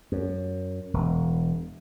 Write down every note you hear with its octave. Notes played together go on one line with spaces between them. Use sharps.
F#2
E1